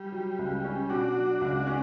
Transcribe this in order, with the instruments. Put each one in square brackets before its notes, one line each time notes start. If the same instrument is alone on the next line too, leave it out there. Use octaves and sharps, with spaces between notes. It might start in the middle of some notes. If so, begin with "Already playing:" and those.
Already playing: [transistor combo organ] G3
[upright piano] F#3
C#2
C#4
[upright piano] B2 [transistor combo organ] D4 F#4
[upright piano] F#3
C#2
C#4